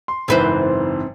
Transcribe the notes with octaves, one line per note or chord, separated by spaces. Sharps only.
C6
F#1 G#2 E3 C4 B4 C5